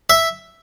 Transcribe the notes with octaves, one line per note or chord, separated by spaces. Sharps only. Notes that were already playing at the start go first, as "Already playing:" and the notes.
E5